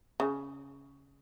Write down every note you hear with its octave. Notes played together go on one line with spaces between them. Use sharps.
C#3